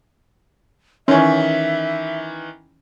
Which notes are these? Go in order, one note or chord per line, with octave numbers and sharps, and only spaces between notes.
D#3 E3 C#4 E5